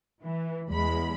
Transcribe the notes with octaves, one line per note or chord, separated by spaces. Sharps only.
E3
E2 G#3 B5